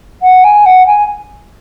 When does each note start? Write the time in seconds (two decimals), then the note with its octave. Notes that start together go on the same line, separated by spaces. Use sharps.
0.22 F#5
0.44 G#5
0.65 F#5
0.86 G#5